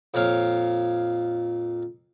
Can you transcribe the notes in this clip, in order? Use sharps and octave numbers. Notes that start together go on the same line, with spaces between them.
F2 A#2 C#5 F5